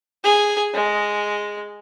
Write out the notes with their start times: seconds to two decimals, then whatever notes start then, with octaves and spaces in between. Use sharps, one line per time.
0.24 G#4
0.74 G#3